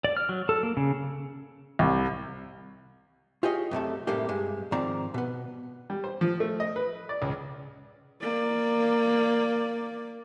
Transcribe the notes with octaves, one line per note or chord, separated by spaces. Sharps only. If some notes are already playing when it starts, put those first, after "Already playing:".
D5
F6
F#3
A4
A#3
C#3
C2
F4 G4 G#4 C#5 D#5
F#2 C3 A3 A4
A2 C3 G3 A3 A#3 G4
G2 G#3
G#2 D#3 F3 C4 D5 A#5
B2 B3
G3
C5
F3
A3
D#5
B4
D5
C#2
A#3 D5